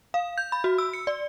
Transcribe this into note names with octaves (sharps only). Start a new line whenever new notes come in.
F5
G6
B5
F#4
E6
C#7
D5